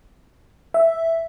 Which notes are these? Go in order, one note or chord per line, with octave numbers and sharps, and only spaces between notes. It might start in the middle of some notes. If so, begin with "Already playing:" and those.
E5